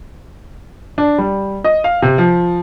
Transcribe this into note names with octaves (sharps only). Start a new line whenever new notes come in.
D4
G3
D#5
F5
C3
F3